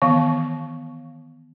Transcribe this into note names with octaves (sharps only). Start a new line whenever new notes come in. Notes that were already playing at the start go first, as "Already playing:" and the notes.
D#3 E3 B3 F5 C#6